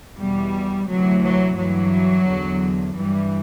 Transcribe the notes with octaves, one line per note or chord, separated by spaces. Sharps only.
E2 B2 G3
D2 C3 E3 F#3
F#3
G2 E3 F#3
E2 D3
G2 E3 G3